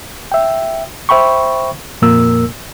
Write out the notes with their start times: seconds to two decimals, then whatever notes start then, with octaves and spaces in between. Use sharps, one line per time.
0.32 E5 G5
1.09 C5 E5 G5 B5 C#6
2.02 F2 A#2 A#3 A#4 E6